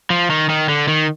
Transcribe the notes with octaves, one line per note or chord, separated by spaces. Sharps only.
F3
D#3
D#3
D3
D#3